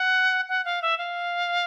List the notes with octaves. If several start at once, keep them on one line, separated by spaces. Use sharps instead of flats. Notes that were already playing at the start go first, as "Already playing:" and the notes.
Already playing: F#5
F#5
F5
E5
F5